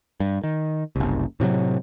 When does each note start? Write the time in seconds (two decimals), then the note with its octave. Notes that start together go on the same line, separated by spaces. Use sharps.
0.20 G2
0.44 D#3
0.96 F#1 C2
1.40 A2 C3 E3 F#3